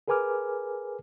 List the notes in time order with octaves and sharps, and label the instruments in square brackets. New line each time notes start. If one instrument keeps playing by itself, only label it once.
[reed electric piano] G#4 A#4 B4 G#5 D6 F6